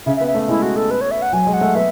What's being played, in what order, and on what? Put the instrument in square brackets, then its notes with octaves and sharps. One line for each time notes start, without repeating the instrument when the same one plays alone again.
[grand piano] C#3 [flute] E5
[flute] E5
[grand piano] B3
[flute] E5
[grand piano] A3
[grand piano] G#3 [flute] E4
[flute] F#4
A4
B4
C#5
E5
F#5
[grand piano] F#3 [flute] G#5
[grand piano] G#3
[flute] F#5
[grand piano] A3
[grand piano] B3 [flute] E5